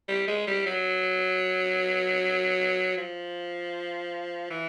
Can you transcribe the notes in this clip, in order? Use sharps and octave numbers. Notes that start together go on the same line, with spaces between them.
G3
G#3
G3
F#3
F3
E3